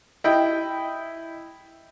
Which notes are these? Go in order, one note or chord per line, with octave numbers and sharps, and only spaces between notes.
E4 D#5 G5